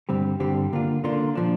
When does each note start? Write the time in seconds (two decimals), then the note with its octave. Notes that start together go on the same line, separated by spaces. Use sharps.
0.09 G2 D3 G3 C4 G4
0.40 G2 D3 G3 C4 G4
0.73 D3 A#3 D4 F4
1.04 D3 A#3 D4 F4
1.35 A#2 F3 D4